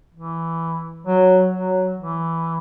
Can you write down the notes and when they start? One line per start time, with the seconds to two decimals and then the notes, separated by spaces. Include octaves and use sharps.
0.14 E3
1.06 F#3
1.52 F#3
1.98 E3